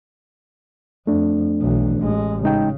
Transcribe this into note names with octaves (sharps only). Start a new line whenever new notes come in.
F2 A3 D4
B1 E3
A1 G#3
C#3 G#3 D#4 G5